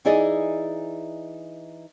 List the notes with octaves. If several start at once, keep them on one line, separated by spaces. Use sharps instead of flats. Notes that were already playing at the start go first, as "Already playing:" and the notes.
E3 D#4 E4 G#4 D5 D#5